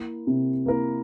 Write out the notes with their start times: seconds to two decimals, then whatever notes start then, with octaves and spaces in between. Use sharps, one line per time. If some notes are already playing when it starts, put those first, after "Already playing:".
Already playing: A#3 E4 A#4
0.27 C3
0.66 A#3 E4 A#4